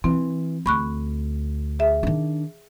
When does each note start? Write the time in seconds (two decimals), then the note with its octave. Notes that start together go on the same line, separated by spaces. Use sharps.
0.04 E3 C4
0.66 D2 B5 C#6 F#6
1.79 G#4 E5
2.03 D#3 D4